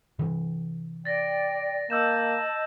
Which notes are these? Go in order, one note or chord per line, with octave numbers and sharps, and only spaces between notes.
C3 E3
D5 G5 A6 A#6
A#3 D#5 A5 E6 G6 E7